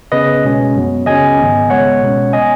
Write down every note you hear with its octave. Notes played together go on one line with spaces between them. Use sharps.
C#3 B3 B4 D#5
B2 G#3 C#4
F#2 F#3 B3
C#3 F#3 C#4 D#5 G#5
G#2 D#3 B3
C#3 G#3 B3 C#5 F#5
B2 G#3 C#4
F#3 B3 D#5 G#5